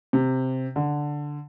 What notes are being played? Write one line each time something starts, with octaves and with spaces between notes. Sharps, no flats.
C3
D3